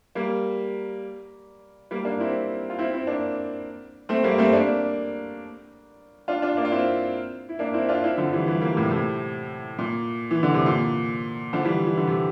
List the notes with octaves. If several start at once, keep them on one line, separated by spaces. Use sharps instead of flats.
G3 A#3
G3 A#3
A#3 D4
C4 E4
F4
C4 E4
C4 E4
A#3 D4
A3 C4
G3 A#3
A3 C4
A#3 D4
D4 F4
D4 F4
A#3 D4
F4
C4 E4
E4
A#3 D4
C4 E4
D4 F4
C4 E4
D3 F3
E3 G3
E3 G3
G3 A#3
A2 C3
A2 C3
A#2
E3
D3
C3
A#2
D3 F3
E3 G3
E3
D3
C3